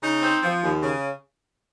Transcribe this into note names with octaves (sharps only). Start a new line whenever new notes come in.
C#3 D#4
C4
F3
D#2
C#3